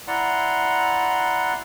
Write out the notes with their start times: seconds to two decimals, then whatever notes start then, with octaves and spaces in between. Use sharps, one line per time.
0.07 E4 D5 F#5 A#5 C6